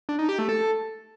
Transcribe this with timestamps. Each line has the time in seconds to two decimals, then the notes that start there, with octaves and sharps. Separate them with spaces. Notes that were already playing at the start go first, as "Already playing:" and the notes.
0.09 D4
0.19 D#4
0.29 G4
0.39 A3
0.49 A4